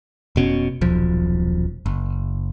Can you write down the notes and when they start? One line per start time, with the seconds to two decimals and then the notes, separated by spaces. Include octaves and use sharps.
0.36 F1 B2 C#4
0.81 D#1 B1 F3
1.86 F#1